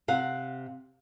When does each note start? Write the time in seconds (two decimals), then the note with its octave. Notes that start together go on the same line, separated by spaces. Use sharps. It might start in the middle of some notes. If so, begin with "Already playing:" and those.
0.08 C3 F5 F#5